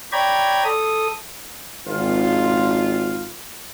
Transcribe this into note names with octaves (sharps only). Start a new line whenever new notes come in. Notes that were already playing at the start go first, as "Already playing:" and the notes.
C#5 D5 G5 A#5 B5 G#6
A4 D#6
G#1 F4